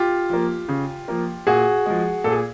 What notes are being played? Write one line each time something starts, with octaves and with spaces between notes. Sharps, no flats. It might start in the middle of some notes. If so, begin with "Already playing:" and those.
Already playing: F4 G4
F3 A#3
C#3
F3 A#3
A#2 F#4 G#4
F3 G#3
A#2 A4
G#4